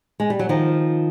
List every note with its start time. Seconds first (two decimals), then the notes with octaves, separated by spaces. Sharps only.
0.20 G#3
0.30 G3
0.39 F#3
0.49 D#3 F3